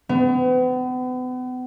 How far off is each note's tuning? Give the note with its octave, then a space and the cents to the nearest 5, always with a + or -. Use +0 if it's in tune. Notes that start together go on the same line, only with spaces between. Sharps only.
B3 +40